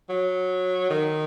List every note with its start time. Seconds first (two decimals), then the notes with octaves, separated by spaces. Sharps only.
0.09 F#3
0.90 D#3